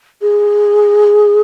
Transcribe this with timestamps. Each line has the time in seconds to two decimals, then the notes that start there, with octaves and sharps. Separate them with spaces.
0.22 G#4